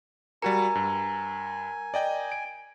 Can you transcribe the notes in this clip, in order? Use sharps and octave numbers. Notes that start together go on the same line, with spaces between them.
G3 F#4 A#4 G#5 A#5 C#7
G2
D5 D#5 G5
D7